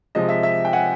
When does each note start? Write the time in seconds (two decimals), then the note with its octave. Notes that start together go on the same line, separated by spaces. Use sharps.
0.15 C3 F3 G#3 D#5
0.29 E5
0.43 E5
0.65 G5
0.73 F#5 G#5